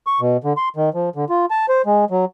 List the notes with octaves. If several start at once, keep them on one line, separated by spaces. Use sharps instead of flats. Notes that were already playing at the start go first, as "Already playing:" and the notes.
C#6
B2
D3
C6
D#3
F3
D3
F4
A5
C5
G#3
F#3